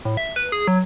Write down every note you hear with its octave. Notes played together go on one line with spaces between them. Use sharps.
A2
E5
B4
G#4
F#3